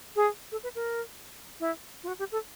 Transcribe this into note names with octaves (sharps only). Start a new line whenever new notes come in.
G#4
A4
B4
A#4
E4
F4
F#4
G4
A4